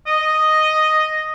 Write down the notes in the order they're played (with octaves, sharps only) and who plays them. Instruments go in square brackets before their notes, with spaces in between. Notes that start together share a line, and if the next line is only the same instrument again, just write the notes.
[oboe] D#5